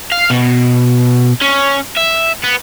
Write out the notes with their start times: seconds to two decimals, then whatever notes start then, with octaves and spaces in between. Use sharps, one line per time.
0.12 F5
0.30 B2
1.42 C#4
1.97 E5
2.44 B3